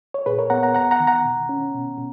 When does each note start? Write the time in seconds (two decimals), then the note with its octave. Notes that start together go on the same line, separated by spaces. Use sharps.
0.14 C#5
0.26 A#2 G#4 B4
0.39 A#4 C#5
0.50 B3 F#5 A#5
0.63 F#5 A#5
0.75 D#2 F#5 A#5
0.91 F#5 A#5
1.00 D#3
1.07 F#5 A#5
1.25 B2
1.49 C#4
1.74 B2
1.98 B2